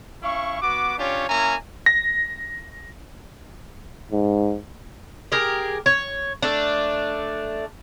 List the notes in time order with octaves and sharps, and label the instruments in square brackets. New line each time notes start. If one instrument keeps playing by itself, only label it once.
[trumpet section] C#4 E4 F5 C#6
B3 F#4 D6
C#4 D4 F4 G4 C#5
A#3 C#4 E4 G#5 A#5
[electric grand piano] A#6
[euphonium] G#2
[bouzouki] G4 G#4 A#4
C#5
A3 D4